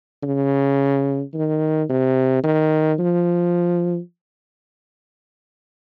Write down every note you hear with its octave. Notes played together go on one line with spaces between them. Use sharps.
C#3
D#3
C3
D#3
F3